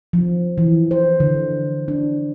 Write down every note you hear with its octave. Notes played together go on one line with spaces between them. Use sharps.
F3
E3
C5
D3
D4